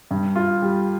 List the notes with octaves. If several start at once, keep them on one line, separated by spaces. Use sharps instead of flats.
G2
F4
G3